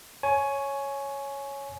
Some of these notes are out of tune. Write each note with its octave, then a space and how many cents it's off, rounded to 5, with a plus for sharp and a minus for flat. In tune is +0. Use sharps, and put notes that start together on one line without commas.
C#5 +0 G#5 +15